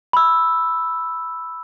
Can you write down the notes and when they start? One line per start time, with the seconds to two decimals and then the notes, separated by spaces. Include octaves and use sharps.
0.13 B5 E6